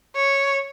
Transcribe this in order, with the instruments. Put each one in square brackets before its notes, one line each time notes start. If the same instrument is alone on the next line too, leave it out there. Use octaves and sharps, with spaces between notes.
[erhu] C#5